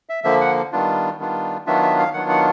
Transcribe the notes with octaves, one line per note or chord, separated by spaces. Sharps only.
E5
D3 F3 A#3 E5
F#5
D#3 G3 B3 D4 F4
D#3 G3 B3 D4 F4
D#3 F#3 B3 D4 F4 E5
E5
F5
D#3 F#3 B3 D4 F4 F#5
F#5